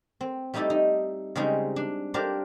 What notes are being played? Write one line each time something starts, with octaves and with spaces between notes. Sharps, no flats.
C4
G3 A3 D#4 E4 G4 A4
D#4
C#3 G3 G#3 C4 D#4 G#4
D4
D4 G4 A#4 C5 D5 F5